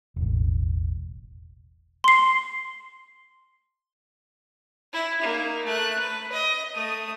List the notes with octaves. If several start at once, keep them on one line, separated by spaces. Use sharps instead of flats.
E1 A1
C6 C7
E4
A#3 D#4
A3 F#6
B4
D#5
A3 D#6